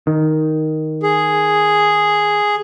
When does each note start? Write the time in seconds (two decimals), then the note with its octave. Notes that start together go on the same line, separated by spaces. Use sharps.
0.07 D#3
1.03 G#4